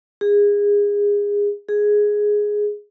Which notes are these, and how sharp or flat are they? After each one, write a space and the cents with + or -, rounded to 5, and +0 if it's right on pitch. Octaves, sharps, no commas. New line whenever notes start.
G#4 -25
G#4 +0